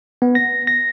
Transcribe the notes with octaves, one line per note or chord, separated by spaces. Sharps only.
B3
A#6
A#6